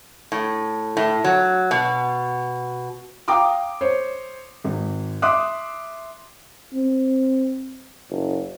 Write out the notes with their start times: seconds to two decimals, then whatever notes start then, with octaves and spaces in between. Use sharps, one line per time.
0.32 A2
0.97 A2
1.24 F#3
1.71 B2
3.28 F5 G5 A#5 D6 D#6
3.81 C5 C#5
4.64 G#1
5.22 E5 C6 D6 D#6 F#6
6.74 C4
8.11 F#1